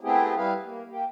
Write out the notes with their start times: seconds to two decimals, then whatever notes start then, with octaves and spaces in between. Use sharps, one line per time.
0.01 A3 B3 C4 E4 G4 G#4
0.36 G3 E4 B4 F5
0.64 A#3
0.89 A#3 G4